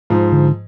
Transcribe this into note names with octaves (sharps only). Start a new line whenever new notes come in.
G#2 F3
D3